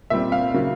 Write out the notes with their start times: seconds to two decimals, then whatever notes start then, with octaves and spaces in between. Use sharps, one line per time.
0.10 A#2 G3 C4 E5
0.32 F5
0.54 C#3 F#3 A#3